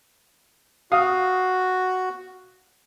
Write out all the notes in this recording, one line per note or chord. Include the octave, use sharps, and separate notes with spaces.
F#4 F5 D#6